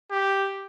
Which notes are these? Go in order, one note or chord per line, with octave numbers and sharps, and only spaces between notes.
G4